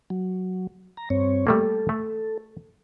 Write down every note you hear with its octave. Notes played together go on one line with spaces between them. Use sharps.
F#3
A#5
G2 C4 C#5
G3 A3 A#3 A4
A3